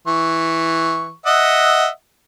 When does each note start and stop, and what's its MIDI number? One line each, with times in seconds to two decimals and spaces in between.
0.07 1.13 52
0.07 1.13 85
1.26 1.88 75
1.26 1.88 76
1.26 1.88 78